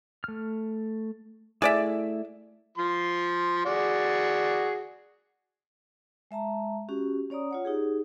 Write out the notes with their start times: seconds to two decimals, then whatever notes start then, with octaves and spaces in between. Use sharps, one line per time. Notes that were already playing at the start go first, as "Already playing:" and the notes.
0.24 A3 F6
1.62 A3 E4 G#4 D5 E5
2.78 F3 C6
3.65 F#4 G#4 D5
6.31 G#3 E5 A5 A#5
6.89 C#4 F#4 G4
7.30 C#4 C#5 D5 A#5 D#6
7.51 F4 C#5 F#5
7.65 D#4 G4 G#4